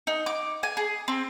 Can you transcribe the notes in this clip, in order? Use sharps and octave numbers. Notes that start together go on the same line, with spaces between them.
D#4
D6
G#5
G#4
C4